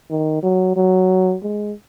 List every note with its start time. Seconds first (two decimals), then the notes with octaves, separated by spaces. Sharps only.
0.10 D#3
0.43 F#3
0.76 F#3
1.43 G#3